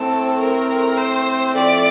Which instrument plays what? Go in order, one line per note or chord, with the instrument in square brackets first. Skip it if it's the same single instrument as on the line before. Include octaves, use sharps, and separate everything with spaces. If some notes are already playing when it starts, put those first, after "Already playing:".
Already playing: [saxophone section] A2 A3 C4 [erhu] A4
[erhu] A#4
A#4
C5
[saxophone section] A2 F3 A3 C4 [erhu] D5